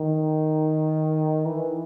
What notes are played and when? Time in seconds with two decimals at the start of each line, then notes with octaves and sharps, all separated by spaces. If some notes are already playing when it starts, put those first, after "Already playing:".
Already playing: D#3
1.45 E3